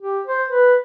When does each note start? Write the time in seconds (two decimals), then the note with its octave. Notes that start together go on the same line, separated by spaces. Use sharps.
0.01 G4
0.27 C5
0.48 B4